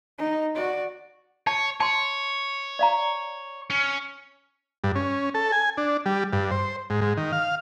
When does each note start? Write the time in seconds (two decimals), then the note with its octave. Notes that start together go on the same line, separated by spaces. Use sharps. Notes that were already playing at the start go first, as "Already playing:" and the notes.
0.19 D#4
0.55 F#4 D5
1.47 C#5 A5
1.80 C#5 A5 C6
2.79 D5 F5 A#5
3.70 C#4
4.84 G2
4.95 C#4
5.34 A4
5.52 G#5
5.77 D4
6.06 G3
6.33 G2
6.51 C5
6.90 G#2
7.01 G#2
7.17 D#3
7.32 F5